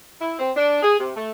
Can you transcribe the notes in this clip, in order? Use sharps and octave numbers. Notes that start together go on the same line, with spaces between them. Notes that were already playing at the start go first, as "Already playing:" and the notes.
E4
C4
D4
G#4
C3
A3